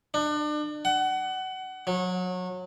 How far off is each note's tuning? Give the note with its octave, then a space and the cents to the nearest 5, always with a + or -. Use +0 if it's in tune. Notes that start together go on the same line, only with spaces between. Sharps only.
D4 +35
F#5 +25
F#3 -25